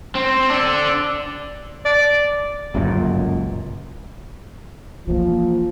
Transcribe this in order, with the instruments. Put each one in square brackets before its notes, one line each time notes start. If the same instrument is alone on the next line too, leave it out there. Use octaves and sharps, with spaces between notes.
[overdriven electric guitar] C4
D4 A4
[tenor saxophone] D5
[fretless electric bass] G1 C#2 F#2 A#2
[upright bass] E3 A#3 [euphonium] F3